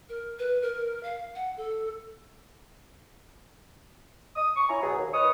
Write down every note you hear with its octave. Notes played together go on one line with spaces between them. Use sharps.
A#4
B4
A#4
F5
F#5
A4
D#6
C#6
C#4 E4 G#5 A#5
B2 F#3 G#4
D#2
D#3 B4 C#5 D#5 D#6